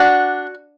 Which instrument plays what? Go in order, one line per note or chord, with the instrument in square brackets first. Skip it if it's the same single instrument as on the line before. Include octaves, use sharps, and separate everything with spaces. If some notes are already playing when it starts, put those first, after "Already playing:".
Already playing: [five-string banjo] D4 F#4